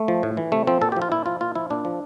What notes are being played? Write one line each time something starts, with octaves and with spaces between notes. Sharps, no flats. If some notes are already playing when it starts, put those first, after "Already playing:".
Already playing: A3
F3
A2
E3
C3 A3
F3 C4
A#2 A4
G4
F3
F4
A#2 E4
F3 F4
A#2 F4
F3 E4
A#2 D4
F3